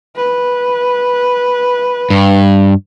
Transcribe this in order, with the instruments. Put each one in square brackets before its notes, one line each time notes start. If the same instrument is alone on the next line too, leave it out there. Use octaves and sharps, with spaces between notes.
[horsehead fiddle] B4
[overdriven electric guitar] G2